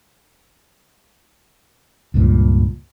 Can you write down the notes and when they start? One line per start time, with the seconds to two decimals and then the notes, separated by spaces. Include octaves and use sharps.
2.14 C#2 G2 A#2